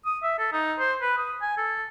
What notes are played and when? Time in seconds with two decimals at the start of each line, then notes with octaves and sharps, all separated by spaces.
0.06 D#6
0.23 E5
0.39 A4
0.53 D#4
0.79 C5
1.02 B4
1.17 D#6
1.42 G#5
1.57 A4